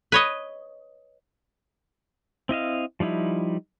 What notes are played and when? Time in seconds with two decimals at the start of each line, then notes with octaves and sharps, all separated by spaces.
0.12 B4 C#5 D#5
2.49 C4 E4 D#5 F5
3.00 F3 G3 D#4 E4